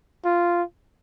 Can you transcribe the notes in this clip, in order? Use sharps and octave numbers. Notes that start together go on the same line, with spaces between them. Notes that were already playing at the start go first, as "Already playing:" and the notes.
F4